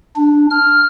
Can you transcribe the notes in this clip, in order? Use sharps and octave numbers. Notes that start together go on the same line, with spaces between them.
D4
F6